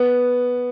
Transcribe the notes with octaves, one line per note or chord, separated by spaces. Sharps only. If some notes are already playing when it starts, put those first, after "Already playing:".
Already playing: B3